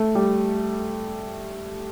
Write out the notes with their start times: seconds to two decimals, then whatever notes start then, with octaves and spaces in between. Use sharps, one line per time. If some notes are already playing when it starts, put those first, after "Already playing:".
Already playing: A3
0.15 G3